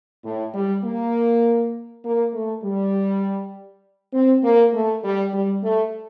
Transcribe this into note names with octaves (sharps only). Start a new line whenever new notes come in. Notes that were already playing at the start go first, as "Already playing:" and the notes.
A2
G3
A#3
A#3
A3
G3
C4
A#3
A3
G3
G3
A3